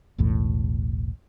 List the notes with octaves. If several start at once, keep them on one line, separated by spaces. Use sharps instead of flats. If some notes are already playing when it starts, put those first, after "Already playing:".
E1 B1 E2 A2